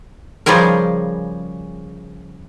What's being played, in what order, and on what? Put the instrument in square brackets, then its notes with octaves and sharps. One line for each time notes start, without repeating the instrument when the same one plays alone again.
[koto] C#3 F3 G3 G#4 A#4